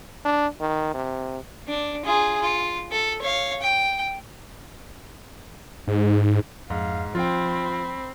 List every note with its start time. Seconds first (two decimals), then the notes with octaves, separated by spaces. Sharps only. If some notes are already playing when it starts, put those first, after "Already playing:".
0.25 D4
0.60 D#3
0.94 C3
1.68 D4
2.05 F4 G#4
2.42 F4
2.92 A4
3.22 C#5 F5
3.62 G5
5.88 G#2
6.70 F2 G#2 F5
7.15 F3 C4 F4 G5 B5